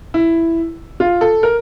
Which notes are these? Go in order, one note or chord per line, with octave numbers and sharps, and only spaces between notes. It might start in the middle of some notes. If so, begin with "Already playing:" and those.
E4
F4
A4
A#4